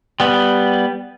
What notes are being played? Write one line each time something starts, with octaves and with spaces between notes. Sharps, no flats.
G3 B3